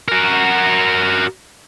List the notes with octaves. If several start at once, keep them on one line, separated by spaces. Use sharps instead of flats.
F#4 A#4